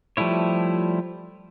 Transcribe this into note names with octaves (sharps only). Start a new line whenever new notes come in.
F3 G3 A3 E4 C#5